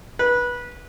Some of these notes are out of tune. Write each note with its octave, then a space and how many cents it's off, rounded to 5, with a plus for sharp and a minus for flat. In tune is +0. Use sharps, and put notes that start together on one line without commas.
B4 -20